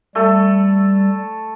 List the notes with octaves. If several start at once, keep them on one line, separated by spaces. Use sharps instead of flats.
G3 A3 A4